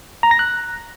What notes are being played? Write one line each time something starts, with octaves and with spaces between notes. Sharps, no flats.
A#5
A#6
F#6